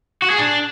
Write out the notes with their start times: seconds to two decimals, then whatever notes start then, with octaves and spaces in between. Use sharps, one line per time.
0.22 F#4
0.31 G#4
0.39 D4